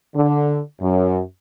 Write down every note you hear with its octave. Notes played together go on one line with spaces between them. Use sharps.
D3
F#2